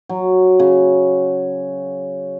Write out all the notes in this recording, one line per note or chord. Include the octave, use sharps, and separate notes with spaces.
F#3
C#3